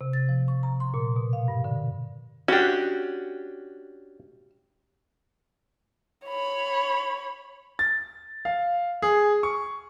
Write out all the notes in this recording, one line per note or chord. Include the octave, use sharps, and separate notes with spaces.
C3
A6
F3
C#6
A#5
C6
A#2
B2
F5
G2
D3
C#4 D4 F#4 G4
C#5 B5
A6
F5
G#4
C#6